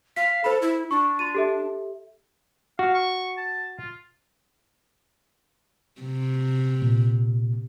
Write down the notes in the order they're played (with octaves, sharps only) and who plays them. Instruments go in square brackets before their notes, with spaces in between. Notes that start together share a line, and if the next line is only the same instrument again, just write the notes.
[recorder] F5 [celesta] B6
[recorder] A4 [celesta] C5 B5
[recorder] E4
[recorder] D4 [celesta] C#6
[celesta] C6 A6 D#7
G4 A4 E5
[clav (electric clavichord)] F#4 [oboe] F5
[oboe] C#6
A5
F4
[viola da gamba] C3
[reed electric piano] A#2